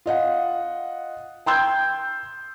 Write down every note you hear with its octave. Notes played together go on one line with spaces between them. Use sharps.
F4 D#5 F#5
G5 C6 E6 G6 G#6